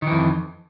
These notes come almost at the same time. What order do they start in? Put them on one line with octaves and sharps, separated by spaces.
D#3 E3 F2